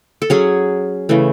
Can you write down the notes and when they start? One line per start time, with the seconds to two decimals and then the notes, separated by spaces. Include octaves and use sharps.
0.22 A4
0.30 F#3 C#4 G#4
1.09 C#3 E3 A3